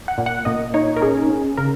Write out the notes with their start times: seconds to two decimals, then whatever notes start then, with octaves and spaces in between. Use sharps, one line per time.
0.08 F#5
0.18 A#2
0.26 F#5
0.45 A#2 D#5
0.74 D#4 C#5
0.96 A#4
1.02 C#4 G#4
1.30 C#4
1.57 C#3 A#4